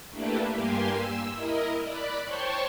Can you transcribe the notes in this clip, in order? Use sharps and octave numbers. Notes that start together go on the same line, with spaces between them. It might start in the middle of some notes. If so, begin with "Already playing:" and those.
A3 A#3 D4 E4 G4 B4
G2 A#3 G4 G#5 C6
E6
E4 A#4 D#5
D5 B5 F#6
C5 C#5 G5 A5 C6 C#6